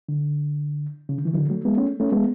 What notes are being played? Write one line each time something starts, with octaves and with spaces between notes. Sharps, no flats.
D3
C#3
D3
E3
D3 F#3
F#3 A3
G#3 B3
A3 C#4
A3 C#4
G#3 B3